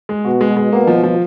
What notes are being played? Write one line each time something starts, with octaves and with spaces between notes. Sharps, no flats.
G#3
B2 F#4
G#3
G#3
B2 A#3
F3
F3